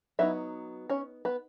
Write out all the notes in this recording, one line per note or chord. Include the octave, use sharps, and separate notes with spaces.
F#3 B3 D#4 E4 E5
C#4 C#5
B3 B4